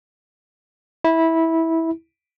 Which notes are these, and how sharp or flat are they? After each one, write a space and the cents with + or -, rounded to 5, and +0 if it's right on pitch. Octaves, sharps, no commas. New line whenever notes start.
E4 -15